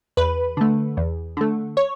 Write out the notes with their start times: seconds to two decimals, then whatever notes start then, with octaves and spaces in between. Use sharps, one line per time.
0.17 E2 B4
0.57 D3 A3
0.97 E2
1.37 D3 A3
1.77 C#5